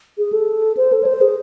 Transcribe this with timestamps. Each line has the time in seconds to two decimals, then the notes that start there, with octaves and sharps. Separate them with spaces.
0.18 G#4
0.33 A4
0.77 C5
0.92 A4
1.03 C#5
1.06 C5
1.21 G#4